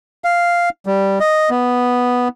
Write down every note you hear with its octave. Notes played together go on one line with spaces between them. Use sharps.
F5
G3
D#5
B3